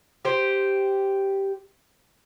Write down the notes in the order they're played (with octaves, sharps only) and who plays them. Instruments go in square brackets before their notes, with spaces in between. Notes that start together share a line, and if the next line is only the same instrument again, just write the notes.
[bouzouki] G4 C5